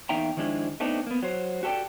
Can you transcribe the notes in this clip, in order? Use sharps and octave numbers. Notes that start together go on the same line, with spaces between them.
E2 A#3 D#4 E5 G5 A#5
D#3 F3 G#3 D4 E4
A3 B3 C4 D4 D#4
A#3 B3
F#3 C5
F#4 G4 A4 B4 D5 G5